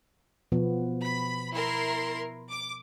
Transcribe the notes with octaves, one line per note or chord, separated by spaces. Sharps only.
B2 F3 B3
B5
E4 A#4 C6
D6